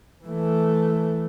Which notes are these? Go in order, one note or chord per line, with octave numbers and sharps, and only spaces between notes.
E3 A3